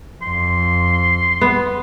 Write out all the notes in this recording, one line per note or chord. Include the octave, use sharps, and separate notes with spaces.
F2 C6
B3